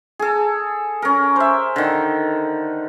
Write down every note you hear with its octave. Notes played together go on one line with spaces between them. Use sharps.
G#4 A4
C#4 A#4
C5 E5
D3 D#3